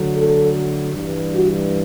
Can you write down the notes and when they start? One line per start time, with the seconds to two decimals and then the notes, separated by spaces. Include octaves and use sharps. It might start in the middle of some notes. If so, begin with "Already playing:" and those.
Already playing: D2 D3 F#3
0.15 A4
0.93 G2 E3 G3
1.34 F#4